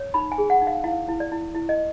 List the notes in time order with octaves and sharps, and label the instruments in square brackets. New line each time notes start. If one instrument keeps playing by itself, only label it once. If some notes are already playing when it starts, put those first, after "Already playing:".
Already playing: [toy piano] C#5
D#4 B5
G#5
G#4
F#5
D#4
F5
E4 F5
E4
D5
E4
E4
D#5